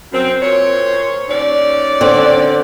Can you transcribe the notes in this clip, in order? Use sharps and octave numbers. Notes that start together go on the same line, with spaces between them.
F#2 C4
A#2 C5 C#5
D#2 C#4 D5
D3 C4